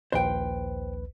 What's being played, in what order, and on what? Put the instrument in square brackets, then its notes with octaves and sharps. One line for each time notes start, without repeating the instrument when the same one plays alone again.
[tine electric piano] A#1 D#2 B4 [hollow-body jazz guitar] C5 G5